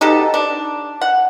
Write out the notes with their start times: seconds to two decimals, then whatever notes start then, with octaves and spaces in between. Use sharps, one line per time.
0.01 B2 D#4 G4 A4
0.34 D4
1.01 F#5